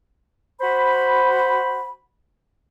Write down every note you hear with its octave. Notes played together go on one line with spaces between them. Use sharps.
F#4 C5 B5